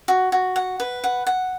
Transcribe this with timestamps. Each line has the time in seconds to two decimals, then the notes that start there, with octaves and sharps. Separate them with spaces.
0.08 F#4
0.32 F#4
0.56 F#5
0.80 B4
1.04 F#5
1.27 F#5